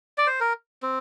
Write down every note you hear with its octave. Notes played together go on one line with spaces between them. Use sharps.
D5
C5
A#4
C4